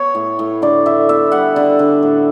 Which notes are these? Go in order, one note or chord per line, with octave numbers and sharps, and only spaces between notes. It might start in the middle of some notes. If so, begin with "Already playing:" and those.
Already playing: B3 C#5
A2
A2
D3 D5
D3 E5
B3 E5
G3 F#5
D3
D3
A2